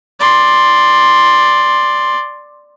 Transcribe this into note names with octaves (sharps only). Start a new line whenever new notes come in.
D5 C6